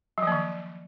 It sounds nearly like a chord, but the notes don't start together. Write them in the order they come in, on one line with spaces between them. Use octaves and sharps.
F#3 F3 A#3 D#3